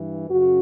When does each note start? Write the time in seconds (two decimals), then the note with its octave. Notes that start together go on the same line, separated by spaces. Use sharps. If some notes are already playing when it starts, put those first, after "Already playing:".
Already playing: G2 E3
0.30 F#2 C#3 F#4